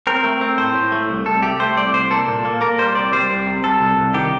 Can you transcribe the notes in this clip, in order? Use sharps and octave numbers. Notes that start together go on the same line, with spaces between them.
C4 A#4
A3
C4
A2 C5
A2
A3
C2
C2 A4
A3 G4
A3 C5
C2 D5
C2 C5
A#3 A4
A#2
A#3
A#3 A#4
G3 C5
C2 D5
G3 C5
C2
C3
C2 A4
C2
C2
D#3 G4